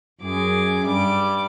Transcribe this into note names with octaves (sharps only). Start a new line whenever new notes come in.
F#2 G#4 D6
G2 G3 D6